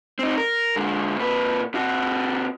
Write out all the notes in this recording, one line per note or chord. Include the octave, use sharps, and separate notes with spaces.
C4 D#4
A#4
D3 G#3
A#2 B4
C3 F#4